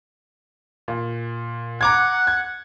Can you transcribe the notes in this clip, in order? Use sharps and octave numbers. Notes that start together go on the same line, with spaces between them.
A#2
F#5 A#5 D6 G#6
G#6